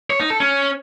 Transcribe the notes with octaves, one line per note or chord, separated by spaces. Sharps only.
C#5
D#4
A4
C#4